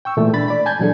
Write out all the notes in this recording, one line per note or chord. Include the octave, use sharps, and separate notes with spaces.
G5 C#6 E6
A#2 E3 G#3 A3
D4 B5 A6
D5 B5
G#5 A5 G6 G#6
A#2 E3 F#3 D4 G#4 A4